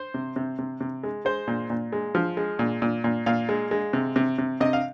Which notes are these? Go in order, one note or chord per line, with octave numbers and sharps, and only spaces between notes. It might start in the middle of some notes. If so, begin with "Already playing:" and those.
Already playing: C5
C3
C3
C3
C3
G#3
G#3 C5
A#2
A#2
G#3
F3
G#3
A#2
A#2
A#2
A#2 F5
G#3
G#3
C3
C3
C3
C3 D#5
F5